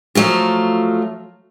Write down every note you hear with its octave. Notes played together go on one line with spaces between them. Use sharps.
F3 F#3 A3 F4